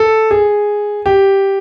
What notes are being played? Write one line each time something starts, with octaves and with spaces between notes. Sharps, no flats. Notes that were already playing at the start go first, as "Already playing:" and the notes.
Already playing: A4
G#4
G4